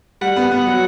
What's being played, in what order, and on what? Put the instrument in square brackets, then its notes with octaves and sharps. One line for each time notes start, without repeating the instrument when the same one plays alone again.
[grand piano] G3 [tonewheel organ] F#5
[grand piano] B3
B3
F#3